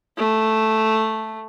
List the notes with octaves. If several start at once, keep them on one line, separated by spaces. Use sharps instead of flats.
A3